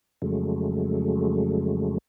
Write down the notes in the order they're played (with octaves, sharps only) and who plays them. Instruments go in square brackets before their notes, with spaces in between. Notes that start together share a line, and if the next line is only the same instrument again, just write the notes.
[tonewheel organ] F2 C#3 F#3 G#3 A3